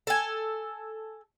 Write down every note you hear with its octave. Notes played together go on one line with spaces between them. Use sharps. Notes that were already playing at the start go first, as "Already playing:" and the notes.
A4 G#5